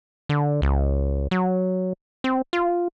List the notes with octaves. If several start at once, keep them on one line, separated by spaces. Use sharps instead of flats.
D3
C#2
F#3
C4
F4